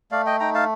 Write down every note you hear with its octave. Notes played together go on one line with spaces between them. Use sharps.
A3 D5 F5
D#5 G5
D#4 G5 A#5
F5 A5